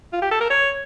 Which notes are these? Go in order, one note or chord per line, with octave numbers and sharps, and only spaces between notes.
F4
G4
A4
A#4
C#5